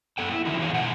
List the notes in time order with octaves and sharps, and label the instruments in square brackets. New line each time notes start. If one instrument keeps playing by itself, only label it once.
[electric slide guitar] F#2 F3 B3 A4 G5
E4
D3 D#3 F3 D#4 E4 F#4
E3 G#4 C5 C#5 F5
B2 D3 F#5 G#5